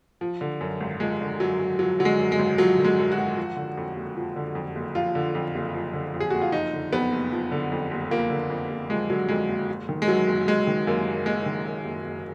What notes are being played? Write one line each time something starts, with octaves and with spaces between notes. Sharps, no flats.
F3
D3
F#2
G#1
F3 G#3
D3
F#2 F#3
G#1
F3 F#3
D3 F#3
G#3
F#2
G#3
G#1
F3 F#3
D3
G#3
F#2
F#4
G#1
F3
D3
F2
F#1
F3
D3
F2
F#1
F3 F4
D3
F2
F#1
F3
D3
F2
G#4
F#1 F#4
F4
F3 D#4
D3
F2 B3
F#1
F3
D3
F2
F#1
F3 A#3
D3
F2
F#1
F3 G#3
D3 F#3
F2 G#3
F#1
F#1
D#3
G#3
F#2 F#3
F#1
F#1 G#3
D#3
F#2 A#3
F#1
F#1 G#3
D#3
F#2
F#1
F#1